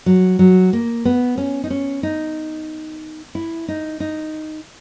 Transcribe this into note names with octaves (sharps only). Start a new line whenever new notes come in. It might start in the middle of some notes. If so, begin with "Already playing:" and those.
F#3
F#3
A#3
B3
C#4
D#4
C#4
D#4
E4
D#4
D#4